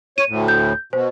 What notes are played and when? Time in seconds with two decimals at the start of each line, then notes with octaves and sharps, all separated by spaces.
0.18 C#5 D#7
0.29 D2 A2
0.48 G6
0.93 B2 C5